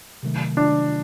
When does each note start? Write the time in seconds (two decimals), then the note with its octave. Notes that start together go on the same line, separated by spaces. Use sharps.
0.23 C3 D#3 F#3 A3
0.57 D4